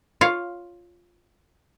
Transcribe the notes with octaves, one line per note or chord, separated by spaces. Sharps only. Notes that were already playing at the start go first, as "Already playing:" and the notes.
F4 C#5 F5